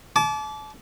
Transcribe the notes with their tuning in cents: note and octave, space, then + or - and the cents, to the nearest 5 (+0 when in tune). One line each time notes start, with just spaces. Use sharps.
A5 -40 D6 -20